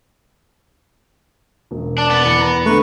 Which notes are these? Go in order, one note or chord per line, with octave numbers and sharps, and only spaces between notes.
E1
D4 D5
B3 A6
E2 C#7
A#5
D3 A3 B4 C#6